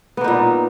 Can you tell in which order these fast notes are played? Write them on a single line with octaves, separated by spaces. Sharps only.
B3 A#3 D#4 A#2